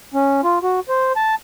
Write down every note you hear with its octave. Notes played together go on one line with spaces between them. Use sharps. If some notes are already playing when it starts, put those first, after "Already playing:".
C#4
F4
F#4
C5
A5